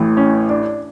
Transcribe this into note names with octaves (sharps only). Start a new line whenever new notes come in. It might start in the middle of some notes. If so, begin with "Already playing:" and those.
Already playing: A1 A2 E3
C#4
D4